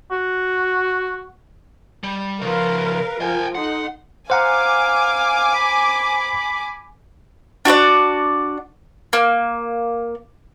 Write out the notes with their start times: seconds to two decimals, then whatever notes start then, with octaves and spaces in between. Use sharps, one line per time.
0.11 F#4
2.04 G3
2.42 C#3 F3 A#4 B4 F5
3.21 F3 A#4 G5 G#5
3.55 D#4 A4 F#5 C6
4.30 C5 F5 F#5 G#5 A#5 D6
5.54 B5
7.65 D4 F#4 B4 D5
9.13 A#3